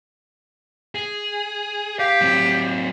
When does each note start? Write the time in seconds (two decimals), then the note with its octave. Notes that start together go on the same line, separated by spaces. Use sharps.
0.95 G#4
1.99 G4 F5
2.22 F#3 C4